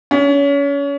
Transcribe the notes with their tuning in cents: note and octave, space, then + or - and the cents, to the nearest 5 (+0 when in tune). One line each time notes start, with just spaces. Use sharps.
C#4 +30